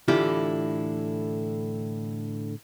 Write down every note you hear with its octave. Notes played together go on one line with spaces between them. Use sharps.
A2 D3 E3 E4 F4 G4